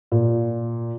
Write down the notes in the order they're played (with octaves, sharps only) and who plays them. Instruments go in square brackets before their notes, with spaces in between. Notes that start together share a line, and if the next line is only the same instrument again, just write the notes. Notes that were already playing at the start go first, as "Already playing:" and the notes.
[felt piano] A#2